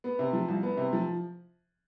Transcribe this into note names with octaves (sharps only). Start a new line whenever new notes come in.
B3
C3
F3
C2
B3
C3
F3